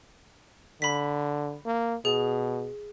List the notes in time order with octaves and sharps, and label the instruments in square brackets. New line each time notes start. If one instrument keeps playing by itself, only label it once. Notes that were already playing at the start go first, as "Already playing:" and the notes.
[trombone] D3 [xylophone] B5 B6
[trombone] A#3
[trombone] B2 [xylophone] G#4